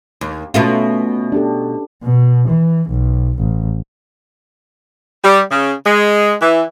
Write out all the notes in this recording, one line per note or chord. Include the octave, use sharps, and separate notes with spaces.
D#2
B2 A3 C#4 F4
D4 G4 A4
B2
E3
B1
A1
G3
C#3
G#3
E3